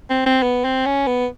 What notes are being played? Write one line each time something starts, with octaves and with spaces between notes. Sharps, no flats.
C4
C4
B3
C4
C#4
B3